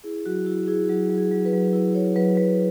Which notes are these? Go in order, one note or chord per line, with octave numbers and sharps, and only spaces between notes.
E4 G#4
F#3 F#4
E4 F#4
E4 G#4
F#3 F#4
F#3
G#4
F#3
B4
F#3
E4 B4
E4 C#5
F#3 B4
F#3 B4